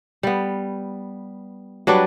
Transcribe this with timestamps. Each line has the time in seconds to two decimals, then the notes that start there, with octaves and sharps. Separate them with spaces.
0.23 G3 B3
1.87 F#3 G3 D4 B4